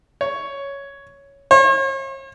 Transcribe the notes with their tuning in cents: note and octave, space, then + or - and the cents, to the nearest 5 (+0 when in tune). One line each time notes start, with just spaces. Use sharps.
C#5 +5
C#5 -45